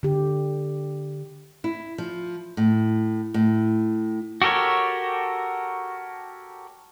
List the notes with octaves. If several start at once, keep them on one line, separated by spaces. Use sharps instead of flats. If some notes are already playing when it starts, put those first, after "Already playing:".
D3 G4
E4
F3
A2
A2
F#4 G4 A4 A#4 C#5